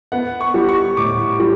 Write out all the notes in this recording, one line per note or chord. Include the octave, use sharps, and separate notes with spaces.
B3 F#5
C#6
G3
C#6
A2 D6
G3